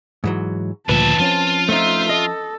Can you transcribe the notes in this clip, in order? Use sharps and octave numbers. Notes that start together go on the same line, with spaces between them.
G#2 E3 F#3
D2 A#2 D#3 F3 B4 E5 A5
F3 C4 C#4 F4
A3 D#4 C5 E5
A4 D#5